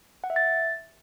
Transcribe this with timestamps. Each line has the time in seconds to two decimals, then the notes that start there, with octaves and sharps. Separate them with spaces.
0.24 F#5
0.30 E5
0.36 A6